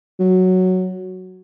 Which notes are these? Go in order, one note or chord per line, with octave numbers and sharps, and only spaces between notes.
F#3